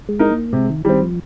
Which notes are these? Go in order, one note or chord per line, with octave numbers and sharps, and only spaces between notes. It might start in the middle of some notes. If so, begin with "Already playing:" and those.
G#3
D#4 A#4
A#3
C3 G#3
D#3
D#3 G3 C4
F3